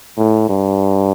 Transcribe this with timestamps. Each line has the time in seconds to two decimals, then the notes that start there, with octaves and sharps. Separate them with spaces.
0.17 A2
0.49 G2